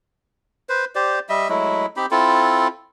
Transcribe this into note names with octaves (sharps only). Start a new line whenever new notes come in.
B4 C5
G4 C5 D5
G3 D#5 E5
F#3 G#3 A3 E4
C4 D#4 G4 B5
C4 E4 F4 A4